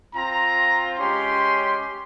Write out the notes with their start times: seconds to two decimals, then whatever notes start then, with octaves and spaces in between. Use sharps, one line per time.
0.14 C4 F4 A#5
0.98 G#3 C#4 G4 C6